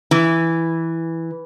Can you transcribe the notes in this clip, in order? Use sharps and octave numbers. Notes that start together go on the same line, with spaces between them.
E3